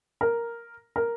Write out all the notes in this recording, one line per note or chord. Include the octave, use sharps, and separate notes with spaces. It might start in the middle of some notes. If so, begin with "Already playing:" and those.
A#4
A#4